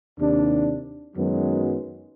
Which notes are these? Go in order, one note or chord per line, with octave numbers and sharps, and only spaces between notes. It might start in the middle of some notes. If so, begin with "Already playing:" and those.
D#2 C3 D4
F#2 D#3 F#3 G#3 B3